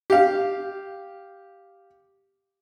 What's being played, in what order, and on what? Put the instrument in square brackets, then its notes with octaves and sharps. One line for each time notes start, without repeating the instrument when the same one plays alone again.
[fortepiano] G4 F5